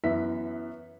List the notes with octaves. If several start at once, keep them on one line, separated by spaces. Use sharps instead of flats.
F#2 E3 B3 E5 B6